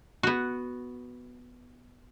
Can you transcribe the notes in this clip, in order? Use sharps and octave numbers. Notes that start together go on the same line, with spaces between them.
B3 F#4